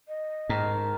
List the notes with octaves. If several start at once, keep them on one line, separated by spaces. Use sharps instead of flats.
D#5
G#2 D#3 A#4 A5